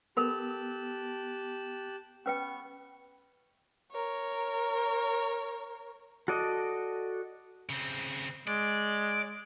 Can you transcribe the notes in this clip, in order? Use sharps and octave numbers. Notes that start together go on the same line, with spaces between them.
B3 G4 A4 A#4 A5 B5 F#6
B3 C#4 B4 G5 C#6
A#4 C#5
F#4 A4 D5 D#5
C#3 C4
G#3 D5